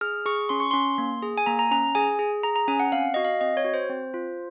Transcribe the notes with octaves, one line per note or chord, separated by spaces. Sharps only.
G#4 F6
G#4 C#6
C#4 C6
C#6
C#4 C6
A#3
G#4
G#5
A#3 A#5
A#5
C#4 A#5
G#4 G#5
G#4
G#4 A#5
A#5
C#4 G#5
F#5
C4 F5
F#4 D#5
F5
C4 D#5
C#5
F#4
C5
C4
F4